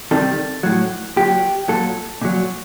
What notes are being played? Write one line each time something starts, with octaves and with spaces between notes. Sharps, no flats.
C3 D#3 G3 A4
A2 F#3
A#2 F#3 G4
A#2 F#3 A4
A#2 F#3